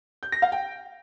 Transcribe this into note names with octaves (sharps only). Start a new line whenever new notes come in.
G6
A#6
F5
G5